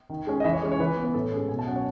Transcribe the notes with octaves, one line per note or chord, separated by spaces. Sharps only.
D#3
G#3 C#4
D#5
E3 E5
C#5
G#3 C#4
C#5
E3 B4
B3
B4
A2 A4
G#3 C#4
B2 G#5
A5
F#3 C#4 F#5
C#5